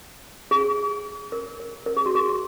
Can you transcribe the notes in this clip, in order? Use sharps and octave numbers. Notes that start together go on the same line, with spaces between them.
G#4
A#4
A#4
A#4
G#4
F#4
G#4